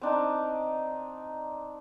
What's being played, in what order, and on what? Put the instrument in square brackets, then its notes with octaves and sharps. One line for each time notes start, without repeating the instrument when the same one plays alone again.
[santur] C4 D4 D#4